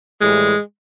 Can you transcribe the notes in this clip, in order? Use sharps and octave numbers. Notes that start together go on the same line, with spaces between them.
A2 E3 G3 G#3